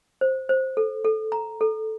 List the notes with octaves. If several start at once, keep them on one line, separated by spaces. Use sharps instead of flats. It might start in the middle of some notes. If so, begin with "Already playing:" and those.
C5
C5
A4
A4
A#5
A4